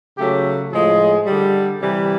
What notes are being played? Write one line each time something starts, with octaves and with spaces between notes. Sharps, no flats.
C#3 F#3 A3 G4
A2 F3 G#3 G#4
D3 G3
C3 E3 G3